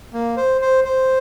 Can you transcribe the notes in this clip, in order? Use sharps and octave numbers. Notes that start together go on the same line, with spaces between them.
A#3
C5
C5
C5